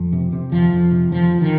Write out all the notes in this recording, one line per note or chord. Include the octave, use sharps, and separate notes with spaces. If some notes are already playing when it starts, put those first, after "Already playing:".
Already playing: F2
C3
C3
F2 F3
F2
C3
F2 F3
C3
D#3